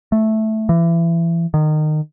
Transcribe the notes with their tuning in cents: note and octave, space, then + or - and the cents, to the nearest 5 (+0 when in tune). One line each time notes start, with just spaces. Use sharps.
A3 -5
E3 +30
D#3 -25